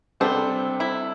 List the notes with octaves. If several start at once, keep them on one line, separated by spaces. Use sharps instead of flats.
C3 G3 B3 C4 D4 A4
E4